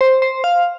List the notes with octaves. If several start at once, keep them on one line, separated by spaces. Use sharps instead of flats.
C5
C5
F5